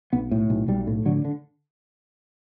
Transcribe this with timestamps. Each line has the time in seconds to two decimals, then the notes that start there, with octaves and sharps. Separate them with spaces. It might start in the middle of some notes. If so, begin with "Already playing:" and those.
0.13 B1 B3
0.31 A2
0.50 B1
0.68 B1 G3
0.87 A2
1.06 D3 F#3
1.25 D3